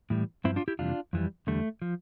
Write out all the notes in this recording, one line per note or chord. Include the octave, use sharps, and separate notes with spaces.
A2 E3 G3
G2 F3 C4 E4
D4 F4
E4 G4
F2 C3 E3 G3 D4 F4
F2 E3 G3
E2 D3 G3 A3
F3